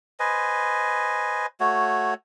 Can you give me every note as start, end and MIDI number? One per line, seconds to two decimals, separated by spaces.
0.20 1.46 71
0.20 1.46 72
0.20 1.46 75
0.20 1.46 80
1.60 2.14 57
1.60 2.14 66
1.60 2.14 73